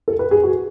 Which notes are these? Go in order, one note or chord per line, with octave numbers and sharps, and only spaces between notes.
A4
B4
G#4
F#4